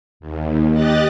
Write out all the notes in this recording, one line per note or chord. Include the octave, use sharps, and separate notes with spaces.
D#2
G4 D#5 F#6 A6